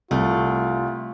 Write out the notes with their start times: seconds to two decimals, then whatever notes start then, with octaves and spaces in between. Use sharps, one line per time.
0.11 C2 A3 F4